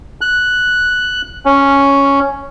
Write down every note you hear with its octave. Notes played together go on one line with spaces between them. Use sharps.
F#6
C#4